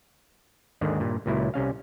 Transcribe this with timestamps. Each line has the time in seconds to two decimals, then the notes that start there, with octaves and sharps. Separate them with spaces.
0.81 D#2 G#2 D3 D#3
1.00 G2 A#2
1.26 C#2 A#2 F#3 E4
1.54 C2 C3 C#4 F5